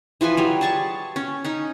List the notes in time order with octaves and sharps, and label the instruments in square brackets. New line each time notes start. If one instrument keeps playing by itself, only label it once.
[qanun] E3 F3 B4 G#5
F#3 G3
G#4 A5 C#6
C#4
C#4 D#4